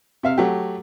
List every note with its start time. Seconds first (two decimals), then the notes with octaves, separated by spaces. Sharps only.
0.23 C3 E5 F5
0.38 F#3 A3 G4